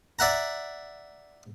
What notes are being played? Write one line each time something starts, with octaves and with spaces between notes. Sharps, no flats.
D5 E5 F#5 A#5